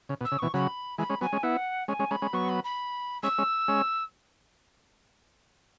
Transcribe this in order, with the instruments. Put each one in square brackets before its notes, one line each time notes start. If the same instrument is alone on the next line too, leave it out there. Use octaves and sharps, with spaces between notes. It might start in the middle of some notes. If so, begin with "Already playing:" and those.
[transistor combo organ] C#3
B2
[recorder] E6
[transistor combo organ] C#3
[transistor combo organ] B2 E3 [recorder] C#6
[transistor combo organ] C#3 F#3 [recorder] B5
[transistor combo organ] E3 G#3 [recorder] B5
[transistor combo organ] G#3 C#4
[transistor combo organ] F#3 B3 [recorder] G#5
[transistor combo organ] G#3 C#4
[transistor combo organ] B3 E4 [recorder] F#5
[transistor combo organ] G#3 C#4 [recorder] G#5
[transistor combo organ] G#3 C#4
[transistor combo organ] G#3 C#4 [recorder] B5
[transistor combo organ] G#3 C#4
[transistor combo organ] F#3 B3 [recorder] C#6
[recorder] B5
B5
[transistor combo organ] G#3 C#4 [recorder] E6
[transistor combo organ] G#3 C#4
G#3 C#4